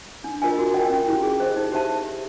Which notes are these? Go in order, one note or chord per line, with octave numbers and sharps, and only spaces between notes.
D4
F4 A#4 D#5 G#5
F#4
A#4 D#5 G5
C#4
E4 G4
G#4
C5 D#5
D#4
G4 C5 E5 A5